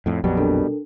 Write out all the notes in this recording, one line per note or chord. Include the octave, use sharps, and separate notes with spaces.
F2 A2
A#1 F2 B2 F#3 G3
D4 A4 A#4